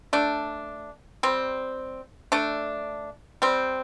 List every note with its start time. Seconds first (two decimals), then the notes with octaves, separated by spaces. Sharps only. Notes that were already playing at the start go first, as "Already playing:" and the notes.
0.13 A3 D4
1.23 G3 C4
2.32 A3 D4
3.42 G3 C4